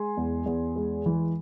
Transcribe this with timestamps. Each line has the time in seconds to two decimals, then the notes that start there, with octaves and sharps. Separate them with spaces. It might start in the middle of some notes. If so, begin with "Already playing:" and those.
Already playing: G#3 G#5 C6
0.17 E2
0.46 E2
0.76 G#3
1.06 E3